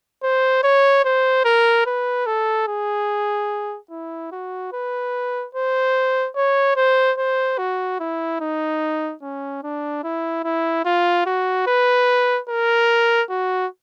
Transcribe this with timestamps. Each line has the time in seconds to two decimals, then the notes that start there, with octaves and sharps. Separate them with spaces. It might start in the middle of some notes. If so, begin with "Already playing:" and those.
0.23 C5
0.63 C#5
1.05 C5
1.45 A#4
1.86 B4
2.26 A4
2.68 G#4
3.90 E4
4.32 F#4
4.73 B4
5.55 C5
6.36 C#5
6.76 C5
7.18 C5
7.58 F#4
8.00 E4
8.40 D#4
9.22 C#4
9.63 D4
10.04 E4
10.44 E4
10.85 F4
11.26 F#4
11.67 B4
12.49 A#4
13.30 F#4